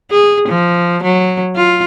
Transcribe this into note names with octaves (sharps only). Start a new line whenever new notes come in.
G#4
F3
F#3
F4